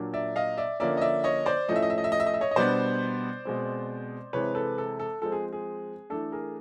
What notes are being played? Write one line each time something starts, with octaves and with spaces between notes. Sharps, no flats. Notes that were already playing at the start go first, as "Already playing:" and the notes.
Already playing: A#2 F#3 A#3 D4
D5 E5
D#5 F5
D5 E5
D3 F3 A#3 C#4 D5 E5
D#5
D5 E5
C#5 D#5
C5 D5
A2 F3 A3 C#4 D#5
E5
D#5
E5
D#5
E5
D#5
E5
D#5
E5
C#5 D#5
D#5
B2 G3 B3 D4 C5 D5
B2 G#3 C4
C3 E3 G#3 C4 B4 C#5
A4 B4
A4
A4
F3 G#3 C4 A4
G#4
G#4
E3 A3 D4 A4
G#4 A#4